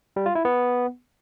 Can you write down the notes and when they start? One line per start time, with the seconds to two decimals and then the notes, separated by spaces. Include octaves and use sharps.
0.16 G3
0.26 F4
0.35 E4
0.45 B3